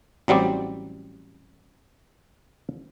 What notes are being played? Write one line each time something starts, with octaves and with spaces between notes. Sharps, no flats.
A1 F#3 G3 C4 D5